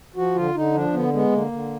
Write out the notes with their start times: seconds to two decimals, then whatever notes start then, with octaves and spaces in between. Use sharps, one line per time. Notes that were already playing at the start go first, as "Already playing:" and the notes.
0.16 F3 F#4
0.35 D3 F4
0.55 D3 D#4
0.74 F3 D4
0.93 D3 B3
1.13 G#3 B3
1.32 D3 A#3
1.52 D3